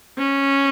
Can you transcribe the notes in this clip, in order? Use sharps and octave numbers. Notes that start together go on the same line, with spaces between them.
C#4